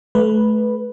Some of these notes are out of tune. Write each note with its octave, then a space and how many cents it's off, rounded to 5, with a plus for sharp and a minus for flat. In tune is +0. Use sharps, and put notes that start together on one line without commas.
A3 -30 B4 -5